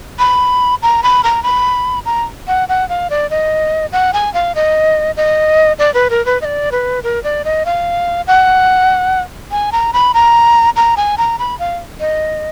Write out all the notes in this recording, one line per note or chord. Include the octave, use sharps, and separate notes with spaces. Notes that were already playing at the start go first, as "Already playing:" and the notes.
B5
A#5
B5
A#5
B5
A#5
F#5
F#5
F5
D5
D#5
F#5
G#5
F5
D#5
D#5
D5
B4
A#4
B4
D#5
D5
B4
A#4
D5
D#5
F5
F#5
G#5
A#5
B5
A#5
A#5
G#5
A#5
B5
F5
D#5